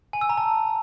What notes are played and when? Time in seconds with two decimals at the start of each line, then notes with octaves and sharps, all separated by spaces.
0.13 G#5
0.21 E6
0.29 A#5
0.37 A5